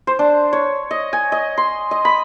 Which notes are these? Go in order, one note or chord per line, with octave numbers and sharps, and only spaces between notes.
C5
D4
C#5
D#5
G#5
D#5
C6
D#5
B5